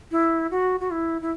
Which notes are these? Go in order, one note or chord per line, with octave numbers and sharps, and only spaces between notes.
E4
F#4
F#4
E4
E4